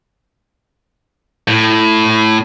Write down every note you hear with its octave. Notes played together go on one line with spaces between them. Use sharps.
A2